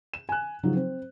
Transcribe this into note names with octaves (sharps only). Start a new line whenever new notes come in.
E7
G#5 F#6
C#3 F3 F#3 D#4 F4
C4 C5